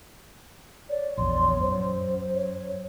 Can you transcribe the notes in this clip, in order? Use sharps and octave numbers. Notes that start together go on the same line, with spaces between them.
C#5 D5
A#1 E2 C6
F#2 C5
C#5